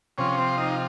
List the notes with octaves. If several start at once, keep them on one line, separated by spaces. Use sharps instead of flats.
C3 F3 C#4
C4
D#4